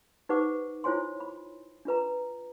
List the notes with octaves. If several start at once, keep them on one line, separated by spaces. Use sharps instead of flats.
D#4 G4 B4 C5 F#5 D6
E4 F4 C5 C#5 G#5 C6
B5
D4 F4 B4 A#5